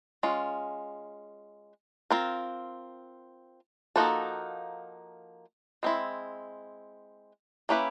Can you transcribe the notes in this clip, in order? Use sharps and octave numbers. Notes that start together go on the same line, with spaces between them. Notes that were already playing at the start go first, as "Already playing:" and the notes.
G#3 C#4 F4
C4 F4 A#4
F3 A#3 D#4 F#4 A4
G#3 C4 E4
A#3 C#4 E4 G4 B4